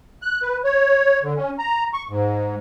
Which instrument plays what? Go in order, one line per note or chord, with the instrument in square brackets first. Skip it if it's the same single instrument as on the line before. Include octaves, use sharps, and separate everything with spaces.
[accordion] F#6
B4
C#5
D3
C#4
A#5
C#6
G#2